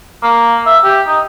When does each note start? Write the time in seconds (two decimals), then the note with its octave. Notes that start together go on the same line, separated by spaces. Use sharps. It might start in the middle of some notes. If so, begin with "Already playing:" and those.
0.23 A#3
0.66 E5
0.84 G4
1.08 D#4